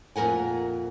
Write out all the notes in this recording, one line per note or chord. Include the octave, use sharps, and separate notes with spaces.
F2 A#2 A#4 F#5 G#5